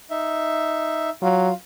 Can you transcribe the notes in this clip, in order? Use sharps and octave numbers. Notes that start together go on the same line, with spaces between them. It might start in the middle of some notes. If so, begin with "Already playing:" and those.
D#4 E5
F#3 F4